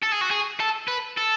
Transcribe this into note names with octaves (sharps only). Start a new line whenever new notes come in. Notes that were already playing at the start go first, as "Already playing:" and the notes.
A4
G#4
F#4
G#4
A4
B4
A4